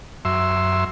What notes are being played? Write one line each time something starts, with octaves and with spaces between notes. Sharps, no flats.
F#2 E5 C6